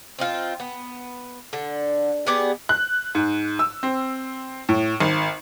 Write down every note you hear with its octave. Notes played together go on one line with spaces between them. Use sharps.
C4 D#4 F4
B3
D3
B3 G4 G#4 D5
F#6
G#2
E6
C4
A2
G#1